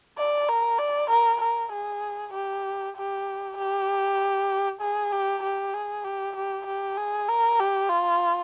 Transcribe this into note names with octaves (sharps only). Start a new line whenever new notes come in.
D5
A#4
D5
A#4
A#4
G#4
G4
G4
G4
G#4
G4
G4
G#4
G4
G4
G4
G#4
A#4
G4
F4